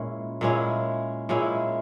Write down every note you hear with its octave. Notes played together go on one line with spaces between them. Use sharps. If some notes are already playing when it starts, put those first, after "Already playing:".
Already playing: A#2 G#3 C#4 E4
A#2 G#3 C#4 E4
A#2 G#3 C#4 E4